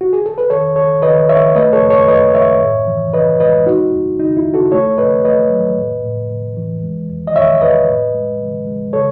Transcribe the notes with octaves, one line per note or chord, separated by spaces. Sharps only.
F#4
G#4
A4
B4
D#3 A4 C#5
D#2 A4 C#5
D#2 B4 D#5
D#2 C#5 E5
A3 B4 D#5
A4 C#5
F#2
A4 C#5
F#2 B4 D#5
F#2 C#5 E5
A2
E3
E3 B4 D#5
G#3 B4 D#5
D#2 D#4 F#4
D#2
C#3 D#4
E4
D#2
F#4 A4
A3 A4 C#5
G#2 B4 D#5
A3 B4 D#5
F#3
A2
A2
A2
E3
G#3
E2
D#5
E2 C#5 E5
E2 B4 D#5
A2
G#3
G#3
G#3
C#3 A4 C#5